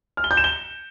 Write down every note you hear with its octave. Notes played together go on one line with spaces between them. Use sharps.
F6
G7
G6
E7
G7